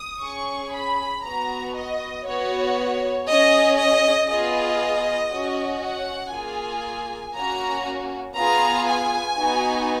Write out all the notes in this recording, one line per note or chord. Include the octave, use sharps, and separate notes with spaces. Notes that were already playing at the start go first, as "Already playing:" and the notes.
Already playing: D#6
C#4 G#4 C#6
B5
B3 F#4 A#5
D#5
B3 F#4 C#5
C#4 G#4 D#5
D#5
B3 F4 G#4 D#5
C#4 F#4
F#5
A#3 F4 G#4 G#5
A#3 C#4 F#4 A#5
B3 F4 G#4 A#5
G#5
B3 D#4 F#4